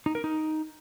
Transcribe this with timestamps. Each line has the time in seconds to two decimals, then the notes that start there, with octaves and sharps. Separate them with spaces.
0.06 D#4
0.15 A#4
0.24 D#4